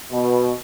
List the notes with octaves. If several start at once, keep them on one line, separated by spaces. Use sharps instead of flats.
B2